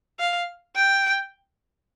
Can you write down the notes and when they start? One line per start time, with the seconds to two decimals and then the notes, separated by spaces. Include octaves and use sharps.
0.19 F5
0.76 G5